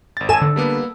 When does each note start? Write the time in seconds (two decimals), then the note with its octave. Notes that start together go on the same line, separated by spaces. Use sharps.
0.17 G#1 A6
0.29 A4 G#5 E7
0.42 D3
0.56 G3 A#3 B3